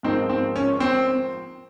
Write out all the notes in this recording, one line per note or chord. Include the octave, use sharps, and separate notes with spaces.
G#2 F3 A#3 C4 D#4
C4
C#4
C4